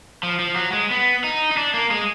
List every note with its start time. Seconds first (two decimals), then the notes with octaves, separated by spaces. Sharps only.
0.23 F3
0.39 F3
0.56 F#3
0.73 G#3
0.91 B3
1.24 D#4
1.52 D#4
1.57 D4
1.74 A#3
1.91 G#3